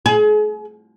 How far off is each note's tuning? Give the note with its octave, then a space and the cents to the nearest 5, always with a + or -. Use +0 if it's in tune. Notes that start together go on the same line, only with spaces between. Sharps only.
G#4 +35